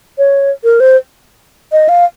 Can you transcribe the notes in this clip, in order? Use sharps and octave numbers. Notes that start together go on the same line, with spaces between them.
C#5
A#4
C5
D#5
F5